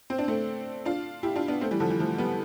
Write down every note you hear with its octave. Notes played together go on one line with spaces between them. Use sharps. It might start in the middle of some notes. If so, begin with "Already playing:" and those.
C4
D4
A3 C4
D4 F4
E4 G4
D4 F4
B3 D4
A3 C4
E3 G3
D3 F3
E3 G3
F3 A3
G3 B3